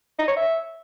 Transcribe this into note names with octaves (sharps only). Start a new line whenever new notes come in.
D#4
C#5
E5